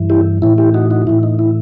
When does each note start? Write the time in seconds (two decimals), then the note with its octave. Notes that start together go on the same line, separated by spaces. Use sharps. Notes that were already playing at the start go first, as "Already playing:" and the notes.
Already playing: G2 E3
0.10 E4 G4
0.42 A2 E3 E4
0.58 E4 G4
0.74 D#4 F#4
0.91 D#4 F#4
1.07 A2 E3 E4
1.23 D#4
1.39 E4